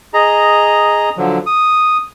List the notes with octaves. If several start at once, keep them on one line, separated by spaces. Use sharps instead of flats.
G#4 D#5 A#5
D3 F3 F#3
D#6